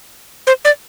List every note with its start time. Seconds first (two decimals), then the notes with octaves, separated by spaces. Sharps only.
0.47 C5
0.65 D5